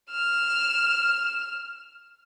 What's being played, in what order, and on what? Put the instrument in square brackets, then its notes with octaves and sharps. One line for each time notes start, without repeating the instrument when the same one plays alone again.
[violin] F6 E7